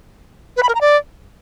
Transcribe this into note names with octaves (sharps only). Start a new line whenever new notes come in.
B4
B5
A#4
A#5
D5